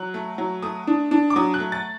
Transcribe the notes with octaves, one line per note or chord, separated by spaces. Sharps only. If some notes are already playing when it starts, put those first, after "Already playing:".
Already playing: F#3 F#6
A3
F#3
A3 D#6
D4
D4
D6
F#3 D#6
F#6
A3
A6